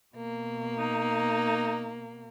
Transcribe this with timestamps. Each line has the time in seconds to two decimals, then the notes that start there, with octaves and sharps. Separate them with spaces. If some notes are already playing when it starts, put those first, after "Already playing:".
0.16 B2 A#3
0.78 D#4